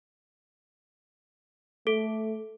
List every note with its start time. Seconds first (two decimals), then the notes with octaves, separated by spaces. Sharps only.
1.87 A3 A4